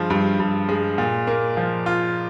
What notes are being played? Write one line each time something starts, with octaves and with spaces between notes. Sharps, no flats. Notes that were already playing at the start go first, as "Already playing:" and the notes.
Already playing: G2 F3 G#3
G2
G2
G#3
A#2
A#3
F3
F4